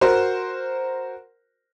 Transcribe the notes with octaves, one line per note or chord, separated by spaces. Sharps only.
F#4 A#4 C5